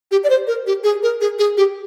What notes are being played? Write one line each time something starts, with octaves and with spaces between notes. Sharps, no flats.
G4
D5
C5
A#4
G4
G#4
A#4
G#4
G#4
G4